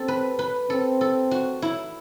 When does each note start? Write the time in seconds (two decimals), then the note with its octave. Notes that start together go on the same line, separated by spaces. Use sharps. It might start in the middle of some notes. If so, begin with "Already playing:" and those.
Already playing: C4 G4 A4
0.08 B4
0.39 B4
0.70 C4 A4
1.01 A4
1.31 F#4
1.62 E4